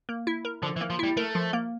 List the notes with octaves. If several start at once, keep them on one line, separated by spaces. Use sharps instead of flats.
A#3
E4
A#4
D3 F3
E3
A#3
F3
G3 E4
A3 A#4
F3
A#3